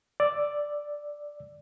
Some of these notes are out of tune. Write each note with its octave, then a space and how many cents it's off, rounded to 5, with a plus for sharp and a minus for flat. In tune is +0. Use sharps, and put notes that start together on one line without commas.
D5 +0 E6 +0